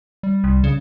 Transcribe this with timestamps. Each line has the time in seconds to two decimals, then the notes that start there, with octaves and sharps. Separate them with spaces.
0.23 G3
0.44 C2
0.64 C#3